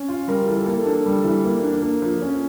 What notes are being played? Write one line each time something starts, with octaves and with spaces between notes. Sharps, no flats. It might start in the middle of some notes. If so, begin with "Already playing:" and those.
Already playing: C#4 C#5
F4
G3 A#4
E3 A4
A#3 A4
D4 A4
G3
E3
A#3
D4
A#3
F3
C#4